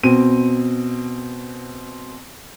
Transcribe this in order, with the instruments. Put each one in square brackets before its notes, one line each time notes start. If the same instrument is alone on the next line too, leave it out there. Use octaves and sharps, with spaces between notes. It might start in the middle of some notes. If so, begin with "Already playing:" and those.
[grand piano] B2 C4 D#7